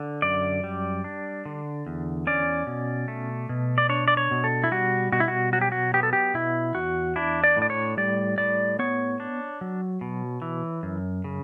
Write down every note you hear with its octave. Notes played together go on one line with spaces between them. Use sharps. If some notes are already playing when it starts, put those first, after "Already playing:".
Already playing: D3
F#2 D5
G3
D4
D3
E2
C#4 D5
B2
A3
B2
D5
D4 C#5
D5
C#5
B2
A4
E4
G3 F#4
B2 F#4
E4
F#4
F#3 F#4
G4
F#4
B3 G4
A4
G4
B2 E4
E2 F#4
D4 E4
D5
A2
D5
C#5
G3 D5
A2 D5
B3 C#5
D4
F#3
B2
E3
F#2
C#3